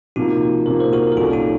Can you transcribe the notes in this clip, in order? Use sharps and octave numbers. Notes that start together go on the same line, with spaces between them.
C3 F3 A#3 D#4 F#4
C3 F3 A#3 A#4
C5
F#4 A#4
A#4
C2 C3 F3 A#3 C#4 F4 A4
D#4 F#4